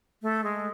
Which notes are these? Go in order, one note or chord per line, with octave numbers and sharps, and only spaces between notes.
A3
G#3